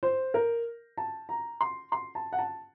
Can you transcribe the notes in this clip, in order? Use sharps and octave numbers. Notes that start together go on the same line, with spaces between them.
C5
A#4
A5
A#5
C6
C6
A5
F#5
A5